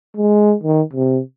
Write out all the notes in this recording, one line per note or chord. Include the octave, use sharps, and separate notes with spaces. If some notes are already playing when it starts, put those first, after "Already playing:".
G#3
D#3
C3